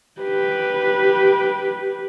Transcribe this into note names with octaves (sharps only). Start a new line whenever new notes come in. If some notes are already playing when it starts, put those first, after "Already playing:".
G4 B4